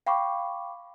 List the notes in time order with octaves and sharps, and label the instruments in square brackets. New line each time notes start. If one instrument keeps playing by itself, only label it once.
[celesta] F5 G5 B5 C#6 D6